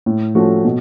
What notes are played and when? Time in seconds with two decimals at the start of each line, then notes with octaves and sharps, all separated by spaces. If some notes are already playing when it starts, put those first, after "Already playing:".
0.06 A2
0.35 F3 A3 C#4 F#4
0.64 B2